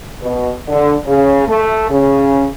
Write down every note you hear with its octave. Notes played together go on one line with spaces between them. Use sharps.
B2
D3
C#3
A3
C#3